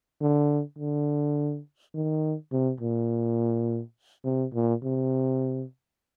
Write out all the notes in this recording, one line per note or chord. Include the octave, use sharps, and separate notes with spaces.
D3
D3
D#3
C3
A#2
C3
A#2
C3